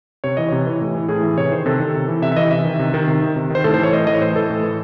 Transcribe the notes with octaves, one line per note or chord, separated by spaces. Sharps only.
C3 C#5
E3 D#5
C3 C#5
E3
A2
E3
A2 G#4
E3
C3 C#5
D#3 C5
C3 A4
D#3
C3
E3
C3 E5
E5
E3 D#5
C3 E5
D#3
C3
D#3
C3
D#3
C3
D#3 C5
A2 A4
C5
E3 C#5
A2 D#5
E3 D#5
C#5
A2 C5
E3 A4
A2
E3